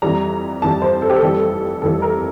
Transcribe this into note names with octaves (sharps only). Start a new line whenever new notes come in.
F2 E3 G3 A#5
F2 E3 G3 A5
C5
A4
G4
A4
F1 F2 E3 G3
F1 F2 E3 G3 A4
A#4